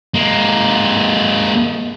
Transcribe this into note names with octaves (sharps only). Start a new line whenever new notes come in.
G#3 A#3